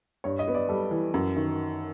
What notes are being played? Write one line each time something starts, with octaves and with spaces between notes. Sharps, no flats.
G2 C#5
D#5
B3
D5
G3 A4
E3
F#2
D#3